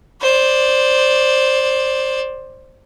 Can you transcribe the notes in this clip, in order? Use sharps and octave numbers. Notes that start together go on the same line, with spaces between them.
C5 D5